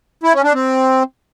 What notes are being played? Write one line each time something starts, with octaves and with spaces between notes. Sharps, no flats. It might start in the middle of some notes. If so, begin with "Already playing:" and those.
E4
C#4
D4
C4